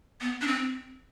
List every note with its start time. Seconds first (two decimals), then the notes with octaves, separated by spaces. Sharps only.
0.21 B3
0.41 D4
0.47 C4